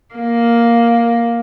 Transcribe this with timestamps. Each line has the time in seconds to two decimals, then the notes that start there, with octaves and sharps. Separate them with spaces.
0.15 A#3